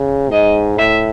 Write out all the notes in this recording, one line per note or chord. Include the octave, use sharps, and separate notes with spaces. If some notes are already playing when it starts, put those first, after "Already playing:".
Already playing: C#3
G#2 D#5
A2 E5